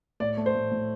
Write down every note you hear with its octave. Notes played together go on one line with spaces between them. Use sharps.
A2 D5
A3
C5
A2
A2